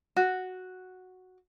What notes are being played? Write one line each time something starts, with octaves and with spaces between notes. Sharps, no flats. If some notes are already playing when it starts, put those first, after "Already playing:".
F#4